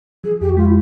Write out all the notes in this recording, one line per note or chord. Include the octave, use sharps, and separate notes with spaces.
F3 G#4
F2 G4
F#4
G#3 F4
E4